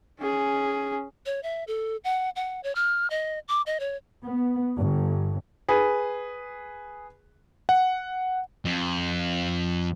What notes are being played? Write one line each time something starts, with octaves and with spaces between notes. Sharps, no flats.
C#4 G#4
C#5
E5
A4
F#5
F#5
C#5
F6
D#5
D6
D#5
C#5
B3
G1 G2
G#4 B4
F#5
F2